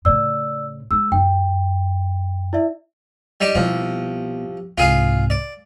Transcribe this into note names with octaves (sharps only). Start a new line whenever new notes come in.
A2 C#3 D5 E6
G#3 E6
F#2 G5
E4 D5 E5
G3 D#4 G4
C2 B2 F3
C2 G#2 F4 G#4 F5
D5